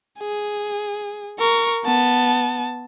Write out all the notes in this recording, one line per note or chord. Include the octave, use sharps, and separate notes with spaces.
G#4
A#4 C#6
B3 A5